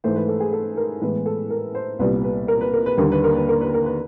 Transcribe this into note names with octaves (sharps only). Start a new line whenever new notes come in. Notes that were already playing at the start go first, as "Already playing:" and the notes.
G#2 E3 A3 C5
B4
A4
G#4
A4
A#4
A2 E3 G#3 B3 B4
A4
A#4
C5
C2 A#2 G3 B3 B4
B4
A#4
B4
A#4
B4
D#2 D3 G3 A#4
B4
A#4
B4
A#4
B4
A#4
B4